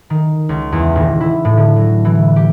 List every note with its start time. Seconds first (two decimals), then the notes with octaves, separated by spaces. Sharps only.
0.10 D#3
0.49 C#2
0.72 E2
0.95 D#1
1.20 E4
1.45 A2
1.57 D3
1.76 F#3
2.05 E3
2.36 G4